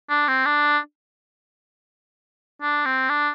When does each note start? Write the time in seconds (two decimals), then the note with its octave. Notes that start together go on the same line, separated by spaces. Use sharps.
0.10 D4
0.28 C4
0.46 D4
2.62 D4
2.86 C4
3.09 D4